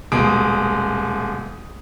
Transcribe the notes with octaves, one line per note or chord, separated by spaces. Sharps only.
D#1 B2 G#3 D#6 D7